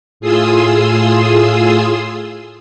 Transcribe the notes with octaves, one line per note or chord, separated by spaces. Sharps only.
A2 F4 G#4 C6 D#6 E6